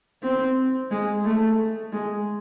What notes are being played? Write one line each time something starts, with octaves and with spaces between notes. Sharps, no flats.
C4
G#3
A3
G#3